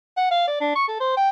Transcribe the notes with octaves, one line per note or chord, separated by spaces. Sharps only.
F#5
F5
D5
D4
C#6
A4
C5
G5